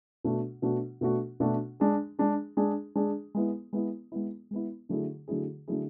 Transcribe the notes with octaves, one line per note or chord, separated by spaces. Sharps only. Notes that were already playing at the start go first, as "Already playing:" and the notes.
B2 A3 D4 F#4
B2 A3 D4 F#4
B2 A3 D4 F#4
B2 A3 D4 F#4
G#3 D4 G#4
G#3 D4 G#4
G#3 D4 G#4
G#3 D4 G#4
G#3 B3 E4
G#3 B3 E4
G#3 B3 E4
G#3 B3 E4
D3 F#3 A3 E4 G#4
D3 F#3 A3 E4 G#4
D3 F#3 A3 E4 G#4